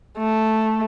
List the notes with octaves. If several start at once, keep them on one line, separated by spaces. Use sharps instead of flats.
A3